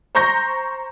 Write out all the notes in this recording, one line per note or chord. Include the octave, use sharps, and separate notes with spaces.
C5 A#5 C#6 G6 A#6